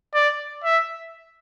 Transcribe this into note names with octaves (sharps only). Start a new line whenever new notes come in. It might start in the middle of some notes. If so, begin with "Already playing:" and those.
D5
E5